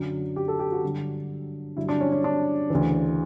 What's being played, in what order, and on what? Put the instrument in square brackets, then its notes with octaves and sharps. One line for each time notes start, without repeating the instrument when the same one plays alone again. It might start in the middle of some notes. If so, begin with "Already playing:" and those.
Already playing: [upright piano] F#2 D3 F#3
G4
A4
G4
F#4
G2 D3 F#3
G2 D3 F#3 E4
D4
C#4
C#4
D4
D2 C#3 E3